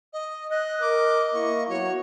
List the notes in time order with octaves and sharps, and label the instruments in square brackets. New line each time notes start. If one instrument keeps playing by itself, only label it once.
[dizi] D#5
[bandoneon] D#5 [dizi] F#6
[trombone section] A#4 [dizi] D6
[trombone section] A#3 E4 [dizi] C#6
[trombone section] F#3 B3 F#4 [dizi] C#5